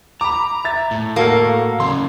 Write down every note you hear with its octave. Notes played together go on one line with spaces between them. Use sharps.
A#5 B5 D6
E5 A6
A2
A#3 F#4 A4 F5
C#3 F#3 C#4 C6